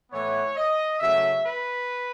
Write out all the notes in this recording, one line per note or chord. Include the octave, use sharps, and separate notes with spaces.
A2 E3 B3 C#5
D#5
C#3 F#3 A3 E5
B4